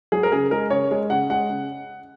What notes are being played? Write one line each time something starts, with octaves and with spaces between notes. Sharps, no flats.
F#3 G#4
A#4
C#3 G#4
G#3 A#4
C#3 C#5
G#3
C#3 F#5
G#3 F#5
C#3